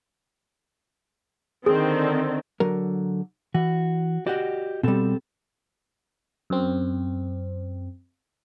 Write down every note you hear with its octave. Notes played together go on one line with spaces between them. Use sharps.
D3 D#3 C4 G#4
D3 F#3 A#4
E3 F#4
F#4 G4 D5 D#5 F#5
B2 G3 C4 A4
F#2 C4